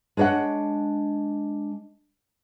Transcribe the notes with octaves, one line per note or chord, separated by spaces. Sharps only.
G#3 D4 C#5 D#5 F#5